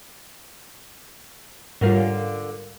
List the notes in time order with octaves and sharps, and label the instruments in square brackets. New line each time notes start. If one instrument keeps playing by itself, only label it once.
[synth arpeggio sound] G#2 G3 F4 [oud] D3 A#4 F5